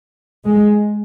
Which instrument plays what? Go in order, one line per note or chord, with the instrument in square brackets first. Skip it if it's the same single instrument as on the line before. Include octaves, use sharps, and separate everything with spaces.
[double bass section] G#3